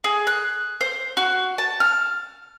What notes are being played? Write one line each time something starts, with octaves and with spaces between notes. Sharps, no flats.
G#4
F#6
C5
F#4
A5
F6